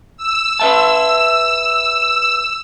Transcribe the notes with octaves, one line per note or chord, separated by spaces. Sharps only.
E6
B4 E5 A5